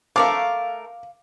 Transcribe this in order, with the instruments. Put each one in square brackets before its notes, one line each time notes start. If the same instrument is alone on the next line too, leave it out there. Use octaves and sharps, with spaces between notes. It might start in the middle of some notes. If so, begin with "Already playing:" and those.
[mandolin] A3 A#4 A5 [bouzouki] F5 [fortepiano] D6